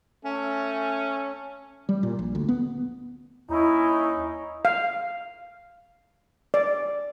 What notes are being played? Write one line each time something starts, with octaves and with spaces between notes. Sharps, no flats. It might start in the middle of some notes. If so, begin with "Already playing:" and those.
A3 C#4
G3
A#2
A#1
D2
B3
D#2 C#4 D#4 E4
F5
D5